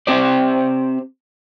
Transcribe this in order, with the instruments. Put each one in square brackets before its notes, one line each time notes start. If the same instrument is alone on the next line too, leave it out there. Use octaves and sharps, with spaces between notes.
[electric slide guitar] C4 G4 C5 D5